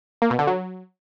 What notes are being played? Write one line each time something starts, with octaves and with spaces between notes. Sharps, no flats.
A#3
B2
D3
F#3